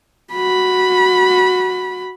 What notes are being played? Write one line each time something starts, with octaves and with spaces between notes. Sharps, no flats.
F#4 B5